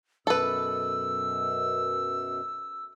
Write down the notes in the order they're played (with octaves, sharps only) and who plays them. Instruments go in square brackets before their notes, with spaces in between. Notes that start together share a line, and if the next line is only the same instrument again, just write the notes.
[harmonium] F#2 B2 [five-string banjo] A4 B4 [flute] E6